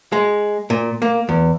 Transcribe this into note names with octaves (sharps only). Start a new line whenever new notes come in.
G#3
A#2
A#3
E2